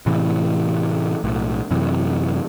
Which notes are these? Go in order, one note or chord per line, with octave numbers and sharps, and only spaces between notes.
A2 C3 E3
B1 A2
F#2 C3 E3